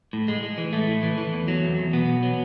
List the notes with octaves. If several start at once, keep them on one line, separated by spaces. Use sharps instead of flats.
A2
G#3
G#3
E3
A2 A3
A2
E3
E3
E2
F#3
E2
E2
B2 B3
E2
F#3